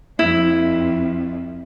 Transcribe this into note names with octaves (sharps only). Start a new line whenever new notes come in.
F2 E4